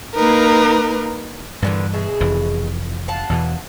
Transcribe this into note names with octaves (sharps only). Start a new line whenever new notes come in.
A#3 D#4 A#4 B4
G2 A#2 D3 E3 B3
B2 G#4 E5
F1 F2 E3
F5 F#5 A5
E2 B2 E3